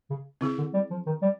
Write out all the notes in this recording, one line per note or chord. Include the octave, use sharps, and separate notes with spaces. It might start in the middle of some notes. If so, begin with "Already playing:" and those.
C#3
C#3 C4 E4 G#4
D3
G3
F3
D#3
G3